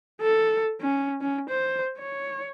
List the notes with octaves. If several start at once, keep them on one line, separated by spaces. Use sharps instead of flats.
A4
C#4
C#4
C5
C#5